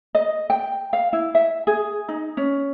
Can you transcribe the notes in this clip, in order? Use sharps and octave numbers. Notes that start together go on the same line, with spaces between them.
D#5
G5
F5
E4
E5
G#4
D#4
C#4